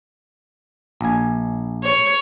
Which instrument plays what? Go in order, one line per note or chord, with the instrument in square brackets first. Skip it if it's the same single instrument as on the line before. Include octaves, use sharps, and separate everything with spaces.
[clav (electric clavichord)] A#1 G#5
[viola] C#5